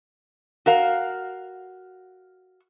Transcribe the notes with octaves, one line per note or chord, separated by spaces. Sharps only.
F#4 A#4 F5